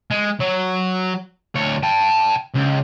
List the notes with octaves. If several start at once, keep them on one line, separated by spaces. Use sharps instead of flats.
G#3
F#3
D2 C#5
G5 A5
C#2